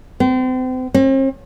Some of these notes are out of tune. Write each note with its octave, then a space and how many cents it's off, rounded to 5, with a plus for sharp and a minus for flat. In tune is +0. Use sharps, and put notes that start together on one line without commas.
C4 -35
C4 +45